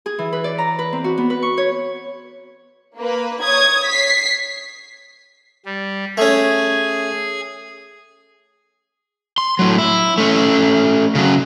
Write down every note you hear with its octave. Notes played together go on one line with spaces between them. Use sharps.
G#4
E3
B4
D5
A#5
B4
C4
F#4
B3
B4
C#6
C#5
A#3 B4
C#5 D#6 G#6
B6 C7
G3
A3 C#4 G#4 G#6
C6
A2 F#3
E4
A3 C#4
C#3 F#3